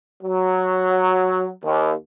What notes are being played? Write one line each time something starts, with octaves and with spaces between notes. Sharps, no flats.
F#3
D#2